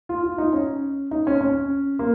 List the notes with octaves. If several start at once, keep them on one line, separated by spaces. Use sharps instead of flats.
F4
F4
D#4
C#4
D#4
C#4
C#4
A#3